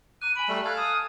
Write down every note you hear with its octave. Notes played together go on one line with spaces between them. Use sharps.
A#5 D6 F#6 D#7
G#5 B5 D7
G3 A3 E7
A4 F5 G#5 F6 F#6 G#6
D#6 E7